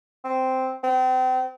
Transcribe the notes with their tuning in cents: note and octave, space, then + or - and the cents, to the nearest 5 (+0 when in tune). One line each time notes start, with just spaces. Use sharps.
C4 -5
C4 -35